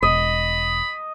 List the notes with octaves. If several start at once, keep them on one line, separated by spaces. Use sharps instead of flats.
E1 D#5 B5